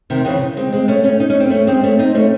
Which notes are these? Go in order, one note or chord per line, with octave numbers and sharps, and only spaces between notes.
C3 D#3
C#3 E3
G#3 C4
G#3 C4
A3 C#4
A3 C#4
D#4
C#4
C4
A3 C#4
G#3 C4
A3 C#4
C4 D#4
A3 C#4